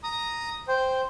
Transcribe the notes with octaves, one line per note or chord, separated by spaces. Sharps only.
A#5 D#6
C5 G5